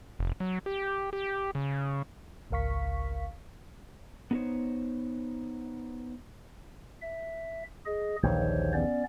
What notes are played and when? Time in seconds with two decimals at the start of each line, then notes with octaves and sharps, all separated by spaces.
0.19 F1
0.40 F#3
0.66 G4
1.13 G4
1.55 C#3
2.51 G#1 C#2 A#4 F5 C#6 B6
4.31 B3 D#4 F#4 A#4 C5 C#5
7.01 E5
7.86 G#4 D#5
8.23 A#1 D#2 E3 C5 C#5
8.74 B3 C#4 D5